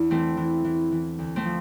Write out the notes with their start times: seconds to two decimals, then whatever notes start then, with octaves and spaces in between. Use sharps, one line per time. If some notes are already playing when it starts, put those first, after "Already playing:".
Already playing: E2 D4 E4
0.10 E3 A3 C4
0.37 E3
0.65 E3
0.92 E3
1.19 D2
1.36 A3 C4
1.45 F3